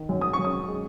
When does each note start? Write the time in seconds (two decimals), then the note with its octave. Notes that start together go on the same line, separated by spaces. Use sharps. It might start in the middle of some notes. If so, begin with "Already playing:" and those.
Already playing: D#3
0.09 F#2
0.21 D#6
0.33 C#6
0.39 F#2
0.44 D#6
0.68 G#3